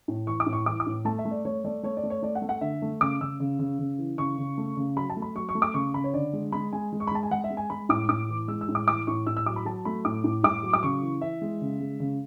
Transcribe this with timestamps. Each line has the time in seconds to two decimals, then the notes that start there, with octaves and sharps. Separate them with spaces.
0.08 A2
0.27 E3 C#6
0.40 D6
0.46 A2
0.53 C#6
0.66 E3 D6
0.80 D6
0.86 A2
1.05 A3 A5
1.19 E5
1.25 A3
1.31 D5
1.45 A3 C#5
1.64 A3 D5
1.83 A3 C#5
1.97 D5
2.03 A3
2.10 C#5
2.22 A3 D5
2.35 F#5
2.42 A3
2.49 F#5
2.61 D3 E5
2.82 A3
3.01 C#3 D6
3.21 C#3 E6
3.40 C#3
3.59 C#3
3.79 C#3
3.98 E3
4.18 C#3 C#6
4.38 C#3
4.58 A3
4.77 C#3
4.96 F#3 B5
5.10 A5
5.17 A3
5.22 B5
5.35 F#3 C#6
5.49 C#6
5.55 A3
5.62 D6
5.74 C#3 C#6
5.94 C#3 B5
6.04 C#5
6.14 D3 D5
6.33 G#3
6.52 G#3 B5
6.73 G#3 G#5
6.93 G#3
7.00 C#6
7.07 B5
7.11 G#3 A5
7.23 G#5
7.31 G#3 F#5
7.44 E5
7.50 G#3
7.57 G#5
7.70 G#3 B5
7.89 A2 D6
8.09 A2 D6
8.29 E3
8.48 G#3 E6
8.61 E6
8.69 A2
8.75 D6
8.87 E3 D6
9.07 A2 C#6
9.27 A2 E6
9.37 E6
9.46 F#3 D6
9.56 B5
9.65 F#3 A5
9.85 A3 B5
10.05 A2 D6
10.24 A2
10.44 A2 D6
10.63 F#3
10.73 D6
10.83 C#3 C#6
11.02 E3
11.21 E3 E5
11.42 G#3
11.62 C#3
11.80 G#3
12.00 C#3